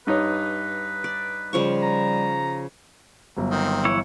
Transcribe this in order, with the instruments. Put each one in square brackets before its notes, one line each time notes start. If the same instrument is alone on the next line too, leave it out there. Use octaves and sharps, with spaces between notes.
[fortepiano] G2 D#4 C#5 [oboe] B4
[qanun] D5
[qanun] C#3 F3 C#6 [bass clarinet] G3
[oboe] A#5
[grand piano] G1 F#3
[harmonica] D#3 C4
[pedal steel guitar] E3 E4 C#5